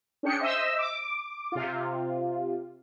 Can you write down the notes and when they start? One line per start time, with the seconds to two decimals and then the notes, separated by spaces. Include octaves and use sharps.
0.23 C#4 D4 G#4 G5 C#7
0.40 C5 D#5 E5 E6
0.78 D6
1.52 C3 F4